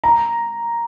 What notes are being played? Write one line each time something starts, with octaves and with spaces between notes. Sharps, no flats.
A#5